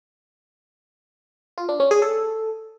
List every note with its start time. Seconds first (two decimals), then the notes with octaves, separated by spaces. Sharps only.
1.58 F4
1.69 D4
1.80 C#4
1.91 G#4
2.02 A4